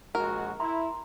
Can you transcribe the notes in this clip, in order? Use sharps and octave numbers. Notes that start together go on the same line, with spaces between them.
A#1 G#3 F#4 A#4
E4 A#5 C6